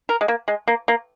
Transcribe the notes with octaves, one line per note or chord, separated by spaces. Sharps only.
A#4
G#3
A#3
G#3
A#3
A#3